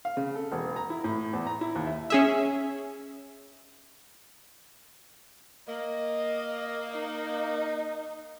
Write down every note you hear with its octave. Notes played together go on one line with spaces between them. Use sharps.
F5
C#3
A4
E1
A#5
E4
A2
E2
A#5
E4
D#2
E5
C#4 G#4 E5
A#3 D#5
D#4